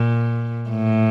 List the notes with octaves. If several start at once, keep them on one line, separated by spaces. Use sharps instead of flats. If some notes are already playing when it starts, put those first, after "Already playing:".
Already playing: A#2
A2